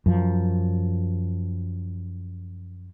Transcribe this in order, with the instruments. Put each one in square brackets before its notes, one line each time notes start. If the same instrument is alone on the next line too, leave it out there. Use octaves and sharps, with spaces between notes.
[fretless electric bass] F#2 F3